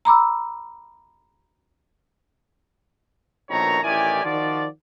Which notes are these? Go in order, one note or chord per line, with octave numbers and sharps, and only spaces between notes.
A#5 B5 D6 E6
A#1 B2 D#3 A3 C#5 A#5
A1 D#3 E4 G4 D5 G#5
D#3 F3 F#4 D5